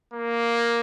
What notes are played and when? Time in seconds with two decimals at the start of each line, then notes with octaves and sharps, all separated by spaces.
0.13 A#3